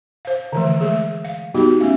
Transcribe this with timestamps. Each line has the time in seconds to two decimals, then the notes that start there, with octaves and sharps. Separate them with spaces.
0.25 C5 F5
0.53 D3 E3 F3 A3
0.81 G#3 A3 G#4
1.24 F5
1.54 G3 B3 D#4 F#4 G4
1.80 A3 C#4 F5